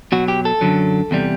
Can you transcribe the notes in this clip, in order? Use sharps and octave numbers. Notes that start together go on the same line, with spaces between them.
B2 F#3 F#4
G4
A4
F#2 D3 F#3
E2 C3 G3